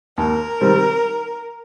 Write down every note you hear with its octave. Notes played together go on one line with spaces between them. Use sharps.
D#2 A#4
D#3 G3 C4